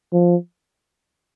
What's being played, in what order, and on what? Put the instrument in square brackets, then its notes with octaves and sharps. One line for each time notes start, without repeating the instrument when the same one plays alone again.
[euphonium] F3